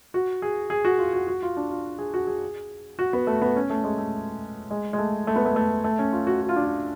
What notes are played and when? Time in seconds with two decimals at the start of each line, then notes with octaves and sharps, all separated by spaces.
0.14 F#4
0.42 G#4
0.70 G#4
0.85 F#4
0.99 F4
1.14 F#4
1.27 F#4
1.42 F4
1.57 D4
1.71 F4
1.99 G#4
2.14 F#4
2.27 G#4
2.99 F#4
3.13 B3
3.27 A3
3.42 B3
3.56 C#4
3.70 A3
3.84 G#3
3.98 A3
4.71 G#3
4.93 G#3
4.98 A3
5.27 A3
5.36 B3
5.46 A3
5.56 A3
5.84 A3
5.99 C#4
6.12 F4
6.27 F#4
6.42 F#4
6.49 F4
6.56 D4
6.64 F4